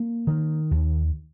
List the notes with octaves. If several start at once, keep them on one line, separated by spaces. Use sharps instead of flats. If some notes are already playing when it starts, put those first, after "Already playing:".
Already playing: A#3
D#3
D#2